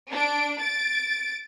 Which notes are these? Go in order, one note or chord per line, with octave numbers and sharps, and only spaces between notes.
D4 D7
A6 D7